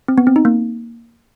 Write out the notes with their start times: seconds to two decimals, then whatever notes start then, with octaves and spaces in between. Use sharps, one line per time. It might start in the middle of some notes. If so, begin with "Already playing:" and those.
0.08 C4
0.18 B3
0.27 C4
0.36 D#4
0.45 A#3